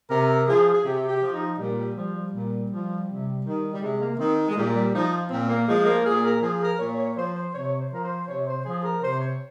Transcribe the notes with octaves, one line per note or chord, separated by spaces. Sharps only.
C3 A#4
F3 G#4
G#4
C3 G4
G4
F3
D#4
A#2 G3
G3
F3 G3
G3
A#2
F3
C3
D#3
G3
C3 G#3
A#3
D#3 C4
G#3
A#2 G3
G3
F3 D#4
A#2 C4
A#3
F3 G#3
A#3
A#2 G#4
A#4
F3 G#4
A#4
A#2 C#5
C#5
F3 C5
C5
C3 C#5
C5
F3 A#4
C5
C3 C#5
C5
F3 G#4
A#4
C3 C5
C#5